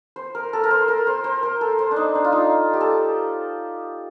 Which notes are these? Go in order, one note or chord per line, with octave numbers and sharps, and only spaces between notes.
C5
A#4
A4
A#4
C5
A#4
C5
C5
A#4
A4
C5
D4
D#4
D4
F4
D#4
G4
A4